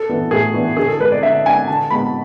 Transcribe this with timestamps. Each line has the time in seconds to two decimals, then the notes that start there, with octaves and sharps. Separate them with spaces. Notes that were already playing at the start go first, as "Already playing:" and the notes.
Already playing: A4
0.09 E3 B3 D4
0.31 A2 G#4
0.54 E3 B3 D4
0.77 D3 G#4
0.88 A4
0.99 G#3 D4 B4
1.12 D5
1.22 D3 E5
1.46 G#3 D4 G#5
1.67 D3 A5
1.90 G#3 B3 B5